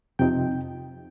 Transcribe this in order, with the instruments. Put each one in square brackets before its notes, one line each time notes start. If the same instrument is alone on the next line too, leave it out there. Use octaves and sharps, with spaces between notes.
[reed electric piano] F2 C3 F3 C4 D#4 G5